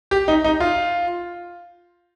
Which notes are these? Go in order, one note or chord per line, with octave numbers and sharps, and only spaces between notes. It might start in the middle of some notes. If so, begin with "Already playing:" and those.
G4
D#4
D#4
F4